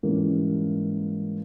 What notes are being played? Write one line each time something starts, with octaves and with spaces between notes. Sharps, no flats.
G#2 E3 G3 A#3 C#4